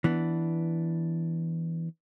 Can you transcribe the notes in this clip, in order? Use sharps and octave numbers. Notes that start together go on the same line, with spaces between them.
E3 B3 D4